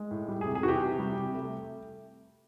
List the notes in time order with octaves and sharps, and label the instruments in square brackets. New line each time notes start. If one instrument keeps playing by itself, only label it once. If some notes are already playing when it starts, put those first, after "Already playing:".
Already playing: [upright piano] G#3
A2
G3
G#4
C3
G#4
E3 F#4 G4
C3
G3
C3
A3